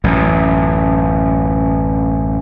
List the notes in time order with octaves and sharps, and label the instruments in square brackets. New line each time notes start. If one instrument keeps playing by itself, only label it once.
[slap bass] A1 F#2